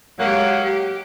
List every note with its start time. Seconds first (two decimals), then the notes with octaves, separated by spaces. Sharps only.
0.19 F#3 G#3 A#3 G4
0.63 G4